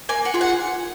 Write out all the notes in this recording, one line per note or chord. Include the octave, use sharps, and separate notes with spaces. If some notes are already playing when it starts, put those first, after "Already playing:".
A#3 G#5
F#5
F4 G#4
F#5